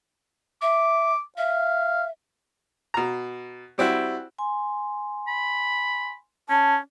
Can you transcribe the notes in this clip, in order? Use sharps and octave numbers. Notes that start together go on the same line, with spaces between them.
E5 D6
E5 F5
B2 A#5
G3 C4 E4 F#4
G#5 C6
B5
C#4 A5